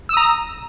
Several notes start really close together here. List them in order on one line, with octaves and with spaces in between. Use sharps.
E6 D#6 A#5